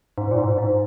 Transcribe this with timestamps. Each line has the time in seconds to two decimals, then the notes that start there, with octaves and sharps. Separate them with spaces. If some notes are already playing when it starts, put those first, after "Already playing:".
0.18 G#2
0.31 A#2
0.38 G#2
0.58 G#2